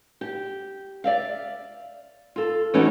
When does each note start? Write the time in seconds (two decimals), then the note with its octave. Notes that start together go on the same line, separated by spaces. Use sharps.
0.21 G4
1.04 D5 E5 F5
2.36 F4 A4
2.74 E3 A3 C#4 D#4 E4 F#4